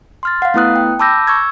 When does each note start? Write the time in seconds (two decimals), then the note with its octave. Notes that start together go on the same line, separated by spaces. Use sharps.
0.23 C6 F6 A6
0.42 F5 F#5
0.54 A3 B3 E4 B4 D#6 F#6
0.76 G5
0.99 A5 B5 D6 E6 G6 A#6
1.27 C#6 E6 G#6